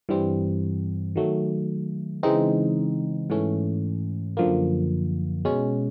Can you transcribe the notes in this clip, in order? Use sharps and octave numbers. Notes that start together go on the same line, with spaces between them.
G2 E3 G3 C4
D#3 F#3 A3
C#3 E3 G#3 C4 D#4
G#2 E3 A3 C#4
F#2 D3 F3 A#3
B2 G#3 C#4